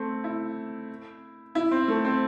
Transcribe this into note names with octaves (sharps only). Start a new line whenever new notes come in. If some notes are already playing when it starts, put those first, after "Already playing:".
Already playing: A3 C4
E4
E4
C4
A3
C4